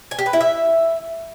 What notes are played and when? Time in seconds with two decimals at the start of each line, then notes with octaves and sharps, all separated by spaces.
0.11 G#5
0.19 G4
0.26 B4
0.33 E4
0.41 E5